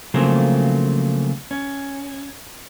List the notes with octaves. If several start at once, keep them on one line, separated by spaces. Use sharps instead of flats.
C#3 F3 F#3 A3 A#3 C4
C#4